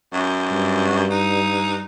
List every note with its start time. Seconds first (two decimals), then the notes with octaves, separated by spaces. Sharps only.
0.13 F#2
0.51 G2
1.11 D#4